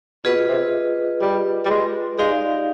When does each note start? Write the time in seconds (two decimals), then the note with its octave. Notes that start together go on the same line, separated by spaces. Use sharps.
0.25 B2 F4 G#4 B4 D#5
0.49 C3
1.21 G3
1.66 G3
1.71 G#3
2.19 G#3 D#4 G4 D5 F5